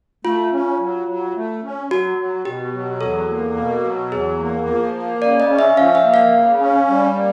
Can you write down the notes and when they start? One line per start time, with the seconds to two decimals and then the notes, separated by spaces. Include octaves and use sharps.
0.25 A3 F4
0.53 C#4
0.80 F#3
1.08 F#3
1.36 A3
1.63 C#4
1.91 F#3 F#4
2.18 F#3
2.45 B2 G4
2.74 F#3
3.01 E2 A4
3.29 A#3
3.56 B2
3.84 F#3
4.12 E2 G#4
4.39 A#3
4.67 F3
4.94 A#3
5.21 C#3 D5
5.40 D#5
5.49 C#4
5.59 E5
5.77 F3 F5
5.95 E5
6.04 A#3
6.14 F5
6.32 C#3
6.59 C#4
6.88 G3
7.15 A#3